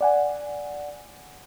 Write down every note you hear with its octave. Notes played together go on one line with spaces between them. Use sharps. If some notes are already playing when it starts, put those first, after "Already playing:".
D5 F#5 G#5